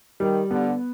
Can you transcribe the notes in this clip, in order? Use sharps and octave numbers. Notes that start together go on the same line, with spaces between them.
D#3 G3
D3 B3